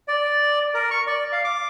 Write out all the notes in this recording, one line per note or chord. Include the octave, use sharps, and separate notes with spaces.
D5
A#4
C#6
D5
F5
D6